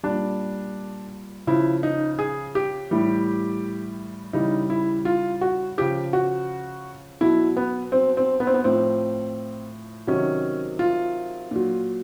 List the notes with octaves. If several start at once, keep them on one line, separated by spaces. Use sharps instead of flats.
A#2 G3 D4
C#3 F3 E4
D#4
G#4
G4
A2 E3 G3
C#3 E3 G3 D#4
E4
F4
F#4
C#3 F3 G4
F#4
B2 F#3 E4
B3
C4
C4
B3
C4
B3
A2 F3 C4
C3 D#3 F#3 C#4
F4
A#2 F#3